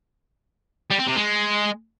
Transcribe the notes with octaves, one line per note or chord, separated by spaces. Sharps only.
G3
C4
C3
G#3